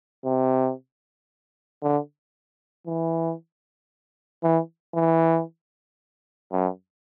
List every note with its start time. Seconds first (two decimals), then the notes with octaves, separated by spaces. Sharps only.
0.25 C3
1.82 D3
2.87 E3
4.43 E3
4.95 E3
6.52 F#2